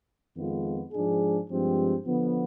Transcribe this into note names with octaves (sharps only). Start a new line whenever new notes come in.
F2 D#3 G#3 B3 F4
G#2 F3 G#3 D4 G#4
G2 F3 G#3 C4 G4
D3 F3 B3